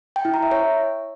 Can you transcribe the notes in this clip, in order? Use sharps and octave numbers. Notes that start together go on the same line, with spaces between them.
G5
E4
A#5
E5
C#5